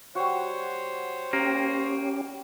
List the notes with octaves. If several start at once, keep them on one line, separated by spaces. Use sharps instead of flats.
G3 F#4 C5 C#5
A#3 C#4 G4